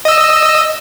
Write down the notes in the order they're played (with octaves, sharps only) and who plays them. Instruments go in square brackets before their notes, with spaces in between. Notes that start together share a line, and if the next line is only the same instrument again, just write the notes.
[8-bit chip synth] D#5 E6